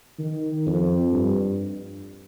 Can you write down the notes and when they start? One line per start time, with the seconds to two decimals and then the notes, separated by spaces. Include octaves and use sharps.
0.19 D#3
0.67 F2
1.12 G2